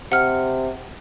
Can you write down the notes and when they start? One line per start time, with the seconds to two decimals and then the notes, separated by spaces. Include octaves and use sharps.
0.12 C3 F#5 F6